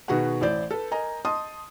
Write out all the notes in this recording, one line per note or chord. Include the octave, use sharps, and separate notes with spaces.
B2 D#3 F#4 G#4 B4 F#5
A1 E4 C5 D5 G6
A4 B4
A#4 D#5 G#5 A#5
D#5 A5 C6 D#6